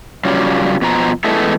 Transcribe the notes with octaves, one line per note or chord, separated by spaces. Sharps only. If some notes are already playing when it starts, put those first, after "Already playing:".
C#3 F#3 G3 F4
B2 F3 A#5
E2 E3 G#3 A3 A4